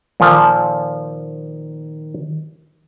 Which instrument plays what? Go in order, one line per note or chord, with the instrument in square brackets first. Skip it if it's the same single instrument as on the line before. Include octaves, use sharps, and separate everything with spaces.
[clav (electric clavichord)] A#2 F3 A4 [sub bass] D#3